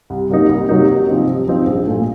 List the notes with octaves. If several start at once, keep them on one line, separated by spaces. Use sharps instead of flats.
C2
C3 F#3 A#3 D#4
C2
C3 F#3 A#3 D#4
C3
F3 C4 D#4
C3
F3 C4 D#4
A#1
A#2 A3